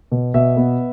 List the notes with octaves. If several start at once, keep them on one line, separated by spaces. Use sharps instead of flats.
B2
B2 E5
B3